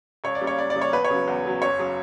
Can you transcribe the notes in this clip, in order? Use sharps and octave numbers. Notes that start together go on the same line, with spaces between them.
C#2 C#5
D5
C#3 G3 A#3
C#5
C#2 D5
D5
C#3 G3 A#3
C#5
E2 B4
C#5
C#3 F#3
E2
C#3 F#3
F#1 C#5
C#3 F#3